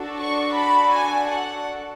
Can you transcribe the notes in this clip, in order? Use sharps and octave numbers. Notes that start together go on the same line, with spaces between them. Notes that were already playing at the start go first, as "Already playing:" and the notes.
Already playing: D4 F#4 A4
C#6
B5
G#5
F#5